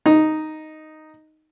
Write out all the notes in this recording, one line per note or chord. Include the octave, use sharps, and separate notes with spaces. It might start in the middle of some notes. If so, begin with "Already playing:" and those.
D#4